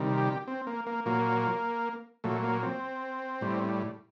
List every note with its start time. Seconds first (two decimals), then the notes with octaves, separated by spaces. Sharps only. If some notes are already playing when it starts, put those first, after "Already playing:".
Already playing: C3 D#3 G3
0.17 G4
0.48 C4
0.67 A#3
0.87 A#3
1.06 A#2 F#3 A#3
2.24 A#2 F#3 A3
2.44 A#3
2.63 C4
3.41 A2 G3